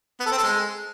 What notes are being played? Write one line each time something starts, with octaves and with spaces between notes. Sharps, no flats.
B3
A4
C4
A4
G#3